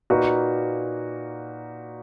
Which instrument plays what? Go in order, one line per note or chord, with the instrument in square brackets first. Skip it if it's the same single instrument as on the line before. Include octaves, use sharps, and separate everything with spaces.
[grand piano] A#2 A#3 D#4 F#4 B4